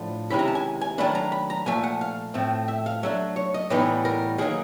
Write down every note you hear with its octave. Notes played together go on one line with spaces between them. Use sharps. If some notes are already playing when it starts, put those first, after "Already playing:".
Already playing: A2 F3 A3 D4 F4
C3 D#3 G#3 C#4 E4 B5
A#5
A5
G#5
G#5
D#3 F#3 A3 D4 B5
A#5
B5
A#5
A#2 F3 A3 G#5
F#5
F5
A2 F3 A3 C4
E5
F5
F#3 A3 D4 E5
C#5
D#5
A2 E3 G3 B3 D#4 D#5
A#4
D#3 F#3 A#3 G#4